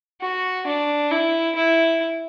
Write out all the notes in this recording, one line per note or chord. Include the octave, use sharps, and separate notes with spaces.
F#4
D4
E4
E4